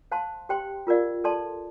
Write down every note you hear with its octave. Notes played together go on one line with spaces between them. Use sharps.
C5 F5 A5 C6
G4 C5 G5 C6
F4 A#4 D5 F5
A4 D5 A5 C6